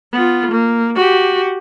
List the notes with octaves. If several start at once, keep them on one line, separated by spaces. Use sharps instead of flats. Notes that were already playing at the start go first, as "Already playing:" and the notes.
B3 F4
A#3
F#4 G4